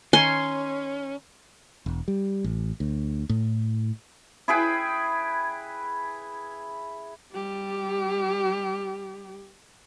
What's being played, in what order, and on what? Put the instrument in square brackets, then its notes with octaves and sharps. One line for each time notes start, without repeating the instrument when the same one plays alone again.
[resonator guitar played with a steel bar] D#3 C#5 G#5 [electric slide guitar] C#4 [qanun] C6
[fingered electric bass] E1
G3
A1
D2
A2
[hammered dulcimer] E4 G#4 B4 G5
[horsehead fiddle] G3 G4